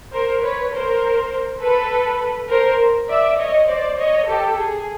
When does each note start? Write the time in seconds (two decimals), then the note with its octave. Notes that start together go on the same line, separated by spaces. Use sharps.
0.13 A#4 C5
0.42 B4 C#5
0.72 A#4 C5
1.61 A4 B4
2.49 A#4 C5
3.09 D5 E5
3.38 C#5 D#5
3.68 C5 D5
3.98 C#5 D#5
4.27 G4 A4
4.56 G#4